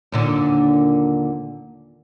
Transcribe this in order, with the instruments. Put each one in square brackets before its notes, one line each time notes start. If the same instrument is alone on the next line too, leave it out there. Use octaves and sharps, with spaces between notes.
[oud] D#2 A#2 D3